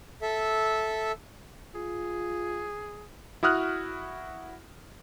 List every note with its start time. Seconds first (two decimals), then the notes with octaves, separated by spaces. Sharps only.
0.22 A4 E5
1.75 F4 G#4
3.43 E4 F#4 D#6 F6 F#6